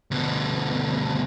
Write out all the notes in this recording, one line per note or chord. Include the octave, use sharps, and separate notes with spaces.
D2 B2